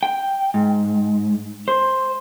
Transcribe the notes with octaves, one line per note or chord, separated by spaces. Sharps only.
G5
G#2
C5